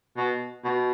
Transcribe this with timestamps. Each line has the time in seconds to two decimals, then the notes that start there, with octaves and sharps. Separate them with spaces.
0.17 B2
0.64 B2